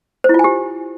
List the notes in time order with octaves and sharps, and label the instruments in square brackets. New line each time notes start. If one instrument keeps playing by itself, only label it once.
[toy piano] C5
E4
F4
G#5
G4